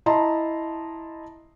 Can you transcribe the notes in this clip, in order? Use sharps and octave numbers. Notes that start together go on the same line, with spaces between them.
E4 D#5 A5 A#5 C6